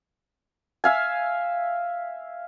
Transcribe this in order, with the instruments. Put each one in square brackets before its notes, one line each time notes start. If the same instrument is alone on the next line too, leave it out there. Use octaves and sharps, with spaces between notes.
[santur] E5 F5 G#5